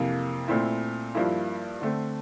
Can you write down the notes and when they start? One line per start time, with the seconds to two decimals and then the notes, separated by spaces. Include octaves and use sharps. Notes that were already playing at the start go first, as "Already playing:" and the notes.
Already playing: F2 C3 E3 A#3
0.48 A#2 A3 C4 E4
1.15 G2 F3 A#3 E4
1.81 D3 A3 C4